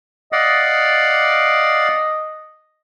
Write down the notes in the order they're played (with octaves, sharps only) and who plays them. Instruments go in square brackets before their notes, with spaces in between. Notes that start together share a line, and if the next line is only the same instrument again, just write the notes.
[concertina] D5 F5 F#5 [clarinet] D#5